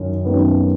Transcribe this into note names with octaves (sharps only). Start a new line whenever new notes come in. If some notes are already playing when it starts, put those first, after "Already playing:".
Already playing: F#2 D#3
F#2 D#3 B3
C#4
B3